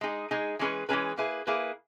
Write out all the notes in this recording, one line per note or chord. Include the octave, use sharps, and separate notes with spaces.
G#3 D#4 G#4
G#3 D#4 G#4
E3 G#3 C#4 G#4 B4
E3 G#3 C#4 G#4 B4
A#3 E4 G#4 B4
A#3 E4 G#4 B4